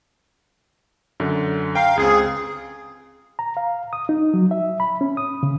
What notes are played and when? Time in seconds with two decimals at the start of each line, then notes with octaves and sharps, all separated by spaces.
1.20 F#2 D3
1.75 F5 G5 A#5
1.97 C#2 C4 G#4
3.39 A#5
3.57 F5
3.93 D#6
4.09 D#4
4.34 F#3
4.51 E5
4.80 B5
5.01 C#4
5.17 D#6
5.43 C#3